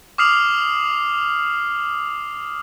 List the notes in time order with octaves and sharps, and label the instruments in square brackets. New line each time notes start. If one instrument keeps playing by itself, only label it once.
[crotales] D6 D#6 F6 C7 F7 F#7